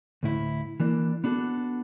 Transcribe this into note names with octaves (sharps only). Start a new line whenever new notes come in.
D2 A2 E4
E3 A#3 D4
B3 D4 F#4 A4